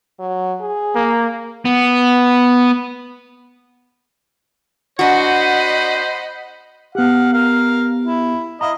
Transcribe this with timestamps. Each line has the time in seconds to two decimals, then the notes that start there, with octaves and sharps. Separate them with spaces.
0.20 F#3
0.60 G#4
0.95 A#3
1.65 B3
4.99 D4 F#4 C5 D#5 F#5 B5
6.95 B3 G4 F5 F#5
7.33 A#4 F5
8.06 E4
8.61 E4 D#5 F5 A#5